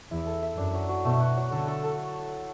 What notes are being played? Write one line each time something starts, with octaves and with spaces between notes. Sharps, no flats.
E2 E4
A4
E5
F#2 D4
F#3
F#3
B2 A3
F#4
F#3
D3 A4
A4
A4